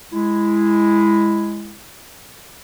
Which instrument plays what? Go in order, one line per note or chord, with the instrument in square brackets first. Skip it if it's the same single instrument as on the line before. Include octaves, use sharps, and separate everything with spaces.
[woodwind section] G#3 E4